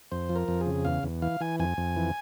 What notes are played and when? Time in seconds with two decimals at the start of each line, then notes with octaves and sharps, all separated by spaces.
0.12 F2 C5
0.29 F3
0.36 A#4
0.48 F2
0.61 G#4
0.66 C#3
0.85 E2 F5
1.03 E2
1.22 E3 F5
1.40 E3 G#5
1.59 F2 G#5
1.78 F2
1.96 E3